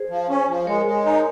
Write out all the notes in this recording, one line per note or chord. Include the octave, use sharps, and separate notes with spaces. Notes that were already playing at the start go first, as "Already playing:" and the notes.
Already playing: G#4 C5
F3
C#4
F3
G#3 A#4 C#5
G#3
D#4